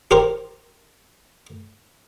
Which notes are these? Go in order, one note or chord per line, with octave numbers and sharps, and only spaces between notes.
G4 A#4 C5